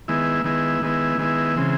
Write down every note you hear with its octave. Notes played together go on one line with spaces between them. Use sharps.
D#3 G#3 B3 E4
D#3 G#3 B3 E4
D#3 G#3 B3 E4
D#3 G#3 B3 E4
C#3 E3 G#3 C4